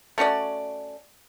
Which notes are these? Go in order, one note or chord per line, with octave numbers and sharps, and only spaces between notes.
A3 C#4 F#4 D5